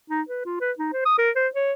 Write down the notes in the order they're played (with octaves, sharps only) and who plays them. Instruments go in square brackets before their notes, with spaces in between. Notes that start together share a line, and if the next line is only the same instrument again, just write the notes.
[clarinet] D#4
B4
F4
B4
D#4
C5
D#6
A#4
C5
C#5